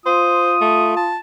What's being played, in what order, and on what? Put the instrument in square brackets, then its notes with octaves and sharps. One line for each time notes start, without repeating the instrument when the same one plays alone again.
[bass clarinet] F4 [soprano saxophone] C5 [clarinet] D#6
[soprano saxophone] A3
A5